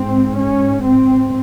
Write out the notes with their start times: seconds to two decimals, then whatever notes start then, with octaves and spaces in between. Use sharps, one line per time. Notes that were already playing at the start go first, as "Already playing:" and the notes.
Already playing: G#2 C4
0.38 C#4
0.85 C4